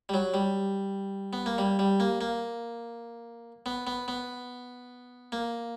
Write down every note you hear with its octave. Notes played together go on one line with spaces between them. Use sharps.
G3
F#3
G3
B3
A#3
G3
G3
A#3
A#3
B3
B3
B3
A#3